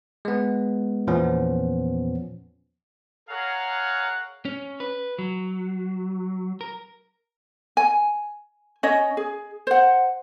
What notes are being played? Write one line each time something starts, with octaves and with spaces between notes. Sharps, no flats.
G#3 B3
E2 A#2 F3 B3 C#4
G#4 A#4 C#5 F5 F#5 A#5
C#4
B4
F#3
A#4
G#5
C#4 C#5 D#5
G#4
C5 F#5